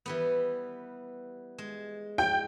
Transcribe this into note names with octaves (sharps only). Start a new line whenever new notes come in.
E3 G3 B3
G#3
G5